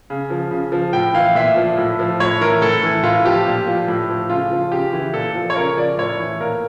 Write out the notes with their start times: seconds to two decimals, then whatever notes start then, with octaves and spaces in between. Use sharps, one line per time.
0.10 C#3
0.30 F3
0.51 C#3
0.72 F3
0.93 A2 G5
1.14 E3 F5
1.35 A#2 E5
1.56 F3
1.77 A2
1.99 F3
2.20 A2 C#5
2.41 E3 A#4
2.62 A2 A4
2.83 E3
3.03 A2 F4
3.25 F3 G4
3.46 A#2
3.67 F3
3.88 A2
4.09 F3
4.29 C#3 F4
4.52 F3
4.71 C#3 G4
4.93 E3
5.14 A#2 A4
5.35 F3
5.50 C#5
5.56 C#3 A#4
5.77 F3 D5
5.98 A2 C#5
6.20 E3
6.40 A#2 A#4